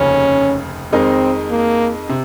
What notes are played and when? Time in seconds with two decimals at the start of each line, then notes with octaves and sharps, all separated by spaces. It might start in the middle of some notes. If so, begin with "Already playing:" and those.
Already playing: F1 D#2 C#3 F3 C#4
0.92 F2 D#3 G#3 C4 D#4 A#4
1.51 A#3
2.09 C3